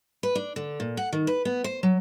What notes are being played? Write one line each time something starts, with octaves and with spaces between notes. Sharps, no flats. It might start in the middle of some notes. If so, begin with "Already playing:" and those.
B4
D4
D3
A#2
F#5
D#3
B4
B3
C5
F#3